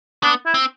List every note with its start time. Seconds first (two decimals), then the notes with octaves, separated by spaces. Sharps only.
0.23 B3 D4
0.46 E4
0.54 C4